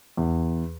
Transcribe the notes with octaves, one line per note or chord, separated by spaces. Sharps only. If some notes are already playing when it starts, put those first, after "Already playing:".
E2